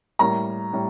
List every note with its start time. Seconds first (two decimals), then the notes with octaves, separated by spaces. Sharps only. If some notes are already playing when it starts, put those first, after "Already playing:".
0.19 A2 G3 A#3 A#5
0.73 A2 G3